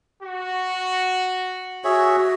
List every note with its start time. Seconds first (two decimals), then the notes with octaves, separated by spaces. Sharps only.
0.23 F#4
1.84 F#4 G#4 C#5 E5